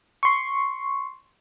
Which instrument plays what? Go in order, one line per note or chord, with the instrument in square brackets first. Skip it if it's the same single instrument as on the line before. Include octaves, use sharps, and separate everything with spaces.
[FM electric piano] C6 C#6